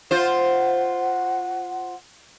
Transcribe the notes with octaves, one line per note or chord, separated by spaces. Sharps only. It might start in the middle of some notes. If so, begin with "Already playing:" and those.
F4 C5 F#5